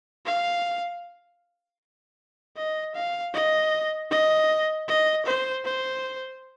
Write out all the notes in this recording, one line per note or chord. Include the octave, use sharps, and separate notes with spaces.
F5
D#5
F5
D#5
D#5
D#5
C5
C5